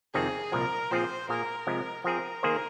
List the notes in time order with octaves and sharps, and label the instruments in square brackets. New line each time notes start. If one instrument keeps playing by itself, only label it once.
[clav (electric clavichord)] F2 C3 D#3 C4 D#4 [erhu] G#4
[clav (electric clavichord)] C2 A#2 F3 [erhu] A#4
[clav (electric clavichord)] A#2 F3 C4 F4 G#4 [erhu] C5
[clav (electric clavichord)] A#2 A#3 G#4 [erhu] A#4
[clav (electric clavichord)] C3 F3 G#3
[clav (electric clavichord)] F3 C4 G#4 [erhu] A#4
[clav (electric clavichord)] D#3 A#3 G#4 C5